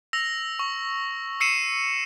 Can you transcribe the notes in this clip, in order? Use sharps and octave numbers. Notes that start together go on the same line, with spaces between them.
E6 A#6 F7
C#6
E6 C7 C#7 D#7 E7